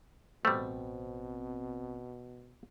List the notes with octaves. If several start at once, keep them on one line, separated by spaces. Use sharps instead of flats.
A1 B2 G3 A3 C4